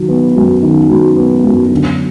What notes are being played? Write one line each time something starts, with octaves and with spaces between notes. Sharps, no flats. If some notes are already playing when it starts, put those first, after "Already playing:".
Already playing: D#3 F#3
B3
F#2
D#3
F#3
B3
F#2
D3